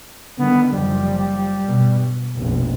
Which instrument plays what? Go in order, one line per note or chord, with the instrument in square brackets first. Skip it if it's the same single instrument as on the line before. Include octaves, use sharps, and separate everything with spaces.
[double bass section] D3 D#3 G3 [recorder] B3
[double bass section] F#1 F3 [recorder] G3
[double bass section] G2 B2
F1 A#1 B2